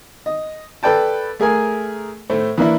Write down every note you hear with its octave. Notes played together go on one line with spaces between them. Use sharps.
D#5
A4 B4 D5 G5 A5
A3 G#4 A#4 G#5
A2 A3 C5
E3 A#3 D4 E4